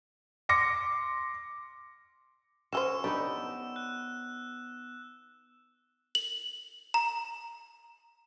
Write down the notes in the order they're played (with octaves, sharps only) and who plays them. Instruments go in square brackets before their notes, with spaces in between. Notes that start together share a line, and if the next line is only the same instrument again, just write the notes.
[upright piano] C6 D6 A#6 C#7
[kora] C#4 [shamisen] F#4 G#4 C5 [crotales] E6 E7
[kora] B3 D#4 G4 [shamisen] D4
[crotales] F#6
[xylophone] F#7
A#5